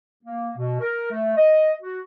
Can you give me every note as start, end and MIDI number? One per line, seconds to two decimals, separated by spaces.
0.23 0.50 58
0.56 0.77 47
0.80 1.09 70
1.10 1.32 57
1.36 1.71 75
1.82 2.00 66